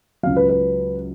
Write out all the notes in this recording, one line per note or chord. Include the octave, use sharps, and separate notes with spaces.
C#2 C#3 F#3 F5
B4
B4